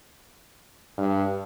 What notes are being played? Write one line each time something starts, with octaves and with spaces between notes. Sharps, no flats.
G2